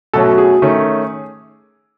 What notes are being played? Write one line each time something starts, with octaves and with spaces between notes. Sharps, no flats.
B2 F#3 A3 C#4 A4
G#4
D#3 A3 C#4